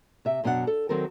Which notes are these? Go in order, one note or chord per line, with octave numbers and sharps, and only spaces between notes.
C3 E5 G5
F#2 B2 D4 F#4 F#5
A4
D#3 F#3 C4 A4 A#4